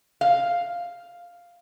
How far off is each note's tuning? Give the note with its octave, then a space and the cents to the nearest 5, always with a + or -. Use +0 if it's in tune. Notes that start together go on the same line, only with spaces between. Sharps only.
F5 +0